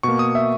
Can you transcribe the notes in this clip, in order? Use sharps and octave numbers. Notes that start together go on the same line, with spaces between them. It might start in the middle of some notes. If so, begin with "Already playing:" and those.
B2 A#3 C#6
D#6
E5